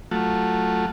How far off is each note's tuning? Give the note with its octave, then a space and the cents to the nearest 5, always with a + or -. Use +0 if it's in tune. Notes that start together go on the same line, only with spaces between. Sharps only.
F#3 +0 A3 +0 F4 +0